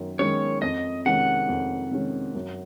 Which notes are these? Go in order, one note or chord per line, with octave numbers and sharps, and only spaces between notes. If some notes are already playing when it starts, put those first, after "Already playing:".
Already playing: F#2 D#3
D#3 G#3 C#4 C#5
F2 D#5
C3 D#3 G#3 C#4 F#5
F2
C3 D#3 G#3 C#4
F#2